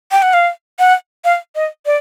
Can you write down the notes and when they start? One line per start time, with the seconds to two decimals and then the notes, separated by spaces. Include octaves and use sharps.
0.12 G5
0.22 F#5
0.33 F5
0.79 F#5
1.24 F5
1.55 D#5
1.86 D5